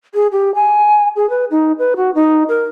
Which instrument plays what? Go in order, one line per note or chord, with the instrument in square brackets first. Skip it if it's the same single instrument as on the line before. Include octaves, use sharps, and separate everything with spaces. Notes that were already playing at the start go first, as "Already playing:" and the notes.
[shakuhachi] G#4
G4
G#5
G#4
B4
D#4
B4
F#4
D#4
A#4